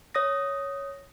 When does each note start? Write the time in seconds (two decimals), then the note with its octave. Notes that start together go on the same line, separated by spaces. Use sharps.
0.15 C#5 D#6 A#6